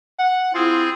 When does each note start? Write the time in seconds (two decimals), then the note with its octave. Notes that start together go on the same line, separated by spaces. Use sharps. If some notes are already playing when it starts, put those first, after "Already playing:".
0.19 F#5
0.54 C4 E4 F4 G#4